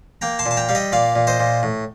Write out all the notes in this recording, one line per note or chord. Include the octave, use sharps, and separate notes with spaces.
A#3 G5 A#5
A5 C6
A#2
A5
G5 A#5
G3 F5
D#5 G5
A#2 D5 F5
A#2
C5 D#5
A#2
A2